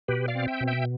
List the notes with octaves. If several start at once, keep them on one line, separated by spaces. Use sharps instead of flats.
B2 G4 B4
D5 F5
C4
E5 G5
B2
E5 G5